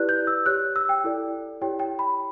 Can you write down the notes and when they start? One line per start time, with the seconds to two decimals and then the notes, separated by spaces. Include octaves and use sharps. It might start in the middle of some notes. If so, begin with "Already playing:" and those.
Already playing: E4 G4 B4 D5 F#6
0.09 G6
0.27 E6
0.46 G4 C#5 F#6
0.76 E6
0.89 G5
1.04 E4 A4 D5
1.61 E4 G4 C#5 G5
1.80 G5
1.99 B5